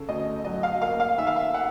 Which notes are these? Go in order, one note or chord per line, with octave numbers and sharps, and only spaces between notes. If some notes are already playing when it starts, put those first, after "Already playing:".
Already playing: C#3 A4
D2 D#5
F#3 D#5
F5
A#3 F5
F5
D#3 E5
F5
E5
F#5